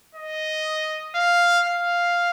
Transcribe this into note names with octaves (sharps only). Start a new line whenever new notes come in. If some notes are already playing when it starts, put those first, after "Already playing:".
D#5
F5
F5